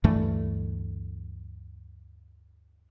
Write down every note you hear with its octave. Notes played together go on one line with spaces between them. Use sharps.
D2 G2 E3 A3